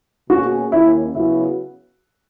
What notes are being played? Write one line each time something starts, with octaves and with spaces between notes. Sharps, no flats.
B2 A#3 C#4 F#4 G#4
D#2 D#3 A#3 C#4 E4
C#3 F#3 B3 E4 F#4